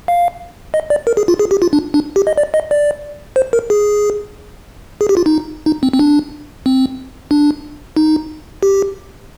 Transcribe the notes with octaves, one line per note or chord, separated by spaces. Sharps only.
F5
D#5
D5
A#4
G#4
F4
G#4
G4
F4
D4
D4
G4
D#5
D5
D#5
D5
C5
A#4
G#4
G#4
G4
F4
D#4
D#4
C4
C4
D4
C4
D4
D#4
G4